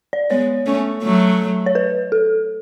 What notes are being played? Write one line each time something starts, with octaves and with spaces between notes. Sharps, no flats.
D5
G#3 B3 C#5
A3 C#4
F#3 A3
C#5
B4
A4